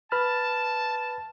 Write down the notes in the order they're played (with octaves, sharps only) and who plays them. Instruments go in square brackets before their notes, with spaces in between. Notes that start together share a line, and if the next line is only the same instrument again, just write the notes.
[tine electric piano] B4 B5 F6 [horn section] A5